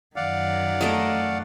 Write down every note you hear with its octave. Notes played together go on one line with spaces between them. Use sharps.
F#2 D#3 D5 F5 F#5
A3 A#4 D#5